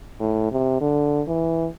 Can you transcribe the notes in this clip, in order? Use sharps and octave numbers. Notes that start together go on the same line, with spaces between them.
A2
C3
D3
E3